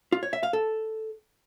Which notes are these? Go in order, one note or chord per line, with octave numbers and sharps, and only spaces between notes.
F4
C#5
E5
F5
A4